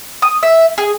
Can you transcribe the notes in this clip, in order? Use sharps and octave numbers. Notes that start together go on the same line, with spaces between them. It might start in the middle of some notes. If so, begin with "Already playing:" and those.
D#6
E5
G#4